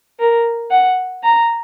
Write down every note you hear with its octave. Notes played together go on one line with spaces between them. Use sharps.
A#4
F#5
A#5